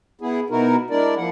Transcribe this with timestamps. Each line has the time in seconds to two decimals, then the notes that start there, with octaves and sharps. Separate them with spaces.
0.21 B3 E4 G#4
0.50 B2 B3 D#4 E4 F#4 A#4
0.90 G#3 D4 E4 A#4 D5
1.17 F3 A#3 E4 F#5